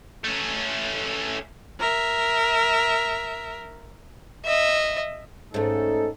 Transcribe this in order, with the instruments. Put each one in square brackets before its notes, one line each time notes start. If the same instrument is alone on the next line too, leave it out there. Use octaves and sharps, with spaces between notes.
[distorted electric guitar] A3 C#4
[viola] A#4 E5
[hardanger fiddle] D#5 E5
[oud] G#2 A3 [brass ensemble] C#4 D#4 A4